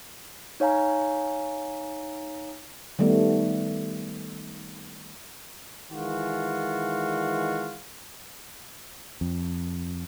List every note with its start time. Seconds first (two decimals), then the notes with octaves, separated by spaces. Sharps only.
0.60 D#4 C#5 F5 G#5 A#5
2.99 D#3 G3 A3 B3
5.91 D#3 E3 G#3 F4 F#4
9.21 F2